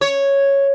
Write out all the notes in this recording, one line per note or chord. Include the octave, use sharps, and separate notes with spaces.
C#5